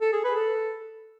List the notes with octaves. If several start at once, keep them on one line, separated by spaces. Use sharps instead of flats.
A4
G#4
B4
A4